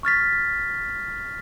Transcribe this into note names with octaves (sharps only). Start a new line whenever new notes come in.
C#6 F6 A6 B6